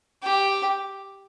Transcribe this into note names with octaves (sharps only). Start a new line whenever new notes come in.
G4